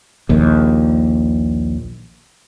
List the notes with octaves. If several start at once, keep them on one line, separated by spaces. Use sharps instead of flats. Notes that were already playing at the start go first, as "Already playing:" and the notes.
A#1 D#2